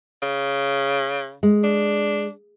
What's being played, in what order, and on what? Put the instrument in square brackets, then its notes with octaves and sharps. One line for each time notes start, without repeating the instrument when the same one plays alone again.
[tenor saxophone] C#3
[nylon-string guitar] G#3
[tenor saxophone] D4